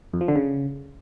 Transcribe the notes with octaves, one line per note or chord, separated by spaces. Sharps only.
F2
F3
D3
C#3